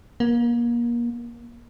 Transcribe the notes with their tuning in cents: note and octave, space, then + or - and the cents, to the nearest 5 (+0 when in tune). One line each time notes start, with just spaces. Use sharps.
A#3 +30